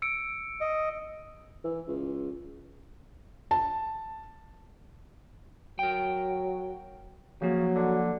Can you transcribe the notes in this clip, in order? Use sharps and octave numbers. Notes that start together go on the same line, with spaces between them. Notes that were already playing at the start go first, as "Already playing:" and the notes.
E6 C#7 D7
D#5
E3
C#2
A5
F#3 A#4 G5
C#3 F3 F#3 A#3
D3